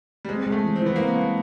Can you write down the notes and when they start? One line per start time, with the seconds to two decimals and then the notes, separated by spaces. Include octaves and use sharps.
0.25 G3
0.28 G#3 C4
0.46 G#3
0.52 A3
0.64 E3
0.76 C4
0.82 E3 B3
0.96 A#3 C4
1.06 B3
1.17 G#3